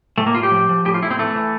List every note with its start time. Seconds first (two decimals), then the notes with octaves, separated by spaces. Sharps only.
0.18 A2 A3
0.26 A#3
0.35 A2 F4
0.43 G4
0.51 F3
0.69 F3
0.85 A2 G4
0.94 F4
1.02 A2 E4
1.11 C4
1.19 E3 A3
1.35 E3